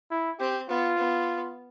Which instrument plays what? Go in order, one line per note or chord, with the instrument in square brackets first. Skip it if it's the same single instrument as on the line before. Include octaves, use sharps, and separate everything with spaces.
[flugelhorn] E4
[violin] C4 [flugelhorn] G4
[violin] B3 [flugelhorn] F4
[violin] B3